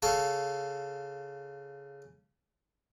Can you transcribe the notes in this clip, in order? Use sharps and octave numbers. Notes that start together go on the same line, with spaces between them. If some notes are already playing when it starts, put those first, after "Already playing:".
C#3 A4 F5 C#6